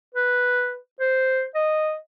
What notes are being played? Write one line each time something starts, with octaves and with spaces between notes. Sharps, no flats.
B4
C5
D#5